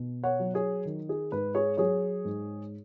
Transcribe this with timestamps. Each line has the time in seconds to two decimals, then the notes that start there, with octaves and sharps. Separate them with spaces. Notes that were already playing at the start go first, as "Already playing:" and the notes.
Already playing: B2
0.24 C#5 F#5
0.39 F#3
0.54 G#4 C#5
0.85 D#3
1.09 G#4
1.32 G#2 B4
1.55 G#4 C#5
1.77 F#3 G#4 C#5
2.25 G#2